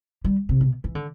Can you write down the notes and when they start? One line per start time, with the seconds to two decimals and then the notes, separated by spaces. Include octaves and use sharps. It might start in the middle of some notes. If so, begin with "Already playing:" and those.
0.24 G3
0.49 C3
0.61 B2
0.84 E3
0.95 D3